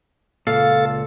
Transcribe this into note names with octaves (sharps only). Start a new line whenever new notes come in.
C#2 A#2 A4 F5